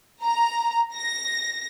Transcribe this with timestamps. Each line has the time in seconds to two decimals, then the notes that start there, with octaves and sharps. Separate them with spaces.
0.23 A#5
0.95 A#6